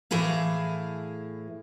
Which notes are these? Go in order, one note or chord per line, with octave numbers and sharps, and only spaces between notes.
A2 E3 E4 G#4 F5